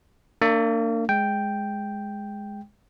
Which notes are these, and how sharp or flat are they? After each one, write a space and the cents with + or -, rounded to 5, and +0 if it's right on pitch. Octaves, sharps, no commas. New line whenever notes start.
A#3 -35 D4 +10
G#3 +0 G5 +0